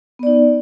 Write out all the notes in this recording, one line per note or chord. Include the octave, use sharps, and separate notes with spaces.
B3 D#4 D5